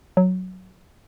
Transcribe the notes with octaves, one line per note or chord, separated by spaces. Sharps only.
F#3